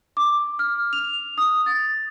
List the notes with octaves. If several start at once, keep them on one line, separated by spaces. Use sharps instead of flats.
D6
F6
F7
D#6
A6